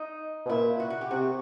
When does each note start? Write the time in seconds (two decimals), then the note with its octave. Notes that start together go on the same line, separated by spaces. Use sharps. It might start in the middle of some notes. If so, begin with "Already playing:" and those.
Already playing: D#4
0.45 B2
0.49 A#2 E4
0.80 F#4
0.90 F#4
1.01 G4
1.11 C3 F#4